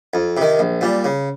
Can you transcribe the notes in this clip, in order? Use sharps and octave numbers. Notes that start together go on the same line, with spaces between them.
F2
C3 D#3
A#1
A#2 G3
C#3